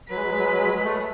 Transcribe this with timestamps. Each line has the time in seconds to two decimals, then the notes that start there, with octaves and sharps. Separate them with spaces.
0.10 F#3 B4
0.16 G#3
0.23 F#3
0.31 G#3
0.37 F#3
0.44 G#3
0.52 F#3
0.58 G#3
0.65 F#3
0.79 G#3
0.84 A3